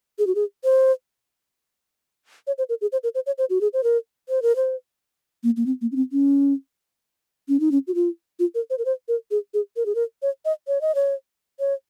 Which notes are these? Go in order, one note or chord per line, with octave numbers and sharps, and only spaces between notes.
G#4
F#4
G#4
C5
C#5
C5
A#4
G#4
C5
A#4
C5
C#5
C5
F#4
G#4
C5
A#4
C5
A#4
C5
A#3
A#3
C4
A#3
C#4
C4
C#4
C#4
D#4
C#4
F#4
F4
F4
A#4
C5
A#4
C5
A#4
G#4
G#4
A#4
G#4
A#4
C#5
D#5
C#5
D#5
C#5
C#5